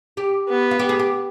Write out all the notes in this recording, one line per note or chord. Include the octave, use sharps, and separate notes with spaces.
G4
B3
F4
G4
G#4
G4